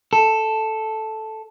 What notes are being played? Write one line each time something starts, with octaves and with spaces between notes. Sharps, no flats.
A4